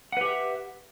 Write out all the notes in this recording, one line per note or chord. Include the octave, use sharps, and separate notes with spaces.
G4 B4 E5 F#5